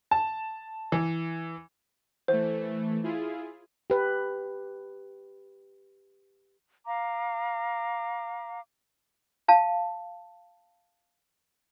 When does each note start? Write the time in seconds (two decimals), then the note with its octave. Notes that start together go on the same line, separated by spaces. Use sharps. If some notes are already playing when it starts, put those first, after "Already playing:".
0.11 A5
0.92 E3
2.28 E3 A3 C5
3.03 E4 F4 G#4
3.90 G4 B4
6.86 F5 A#5 D6
9.48 F5 A5